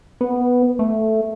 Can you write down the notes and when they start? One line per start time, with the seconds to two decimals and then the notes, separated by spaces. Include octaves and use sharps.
0.21 B3
0.79 A3